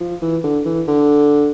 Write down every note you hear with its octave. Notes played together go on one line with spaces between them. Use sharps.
F3
E3
D3
E3
D3